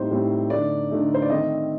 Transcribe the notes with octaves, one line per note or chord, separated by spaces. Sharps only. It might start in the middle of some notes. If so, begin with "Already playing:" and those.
Already playing: A2 G3 C4 D#4 C5
A2 G3 C4 D#4
D3 A3 D#4 D5
D3 A3 D#4
C5
D5
D#3 A3 C4 D#5